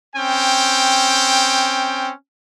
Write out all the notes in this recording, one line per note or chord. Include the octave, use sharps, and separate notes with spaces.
C4 C#4 G5